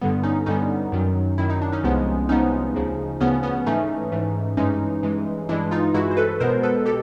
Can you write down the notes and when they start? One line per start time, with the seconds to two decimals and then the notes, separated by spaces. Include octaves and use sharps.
0.01 G2 D3 G3 B3
0.23 C#4 D#4
0.46 G2 D3 G3 B3 C#4 D#4
0.92 F#2 D#3 F#3
1.38 F#2 D#3 F#3 E4
1.50 D#4
1.62 D4
1.72 C#4 D#4
1.83 C2 C3 F3 G#3 B3
2.29 C2 C3 F3 G#3 B3 C#4 D#4
2.75 D2 C#3 F3
3.20 D2 C#3 F3 B3 C#4
3.43 B3 C#4
3.66 G#2 E3 A3 C#4 D#4
4.12 G#2 E3 A3
4.57 G2 E3 G#3 C#4 D#4
5.03 G2 E3 G#3
5.49 G2 E3 G#3 D4 E4
5.71 D#4 F4
5.94 G2 E3 G#3 E4 F#4
6.11 C5
6.17 A4 B4
6.40 B2 G#3 B3 A#4 C5
6.63 A4 B4
6.85 B2 G4 A4